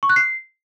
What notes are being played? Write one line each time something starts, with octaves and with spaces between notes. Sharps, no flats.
C#6
F#6
C7